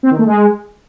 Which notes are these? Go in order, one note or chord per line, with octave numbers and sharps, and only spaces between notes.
C4
D#3
A3
G#3